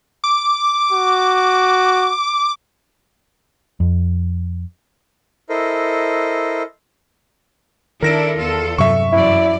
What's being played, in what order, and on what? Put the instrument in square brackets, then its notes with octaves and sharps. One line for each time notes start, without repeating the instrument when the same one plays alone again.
[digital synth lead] D6
[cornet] F#4
[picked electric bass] F2
[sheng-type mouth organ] E4 A4 A#4 C5 D#5
[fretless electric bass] D#3 [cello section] D4 E4 A4 [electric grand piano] A#4 A#6 D7
[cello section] E2 F4 A4
[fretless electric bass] G2 C3 F#3 [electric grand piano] E5 C#6
[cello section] F#2 E3 D5 [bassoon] E4